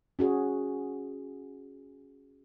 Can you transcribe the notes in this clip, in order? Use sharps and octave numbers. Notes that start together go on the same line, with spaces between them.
C#4 F#4 G#4